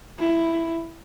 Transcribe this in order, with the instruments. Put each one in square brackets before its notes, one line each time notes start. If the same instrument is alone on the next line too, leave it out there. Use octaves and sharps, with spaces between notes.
[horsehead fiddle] E4